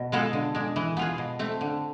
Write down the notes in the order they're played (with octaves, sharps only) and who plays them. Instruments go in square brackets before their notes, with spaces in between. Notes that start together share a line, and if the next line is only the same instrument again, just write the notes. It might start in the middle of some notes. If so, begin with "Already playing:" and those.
Already playing: [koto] B2
G#3 B3 F4 A4
D3
G#3 D4
E3
B3 F4 G#4
B2
A3 C4
D3